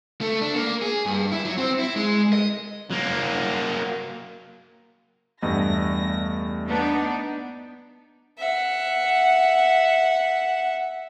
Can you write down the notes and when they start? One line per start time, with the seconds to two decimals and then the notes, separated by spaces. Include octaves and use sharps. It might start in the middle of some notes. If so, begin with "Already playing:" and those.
0.21 A3
0.41 D4
0.55 A#3
0.82 G#4
1.06 G2
1.32 E4
1.45 F#3
1.58 C4
1.79 E4
1.96 G#3
2.33 D#5
2.90 F#3 A#3
5.42 E2 G2 G3 A3 D#5 A#6
6.67 B3 D4 D#4
8.37 E5 F#5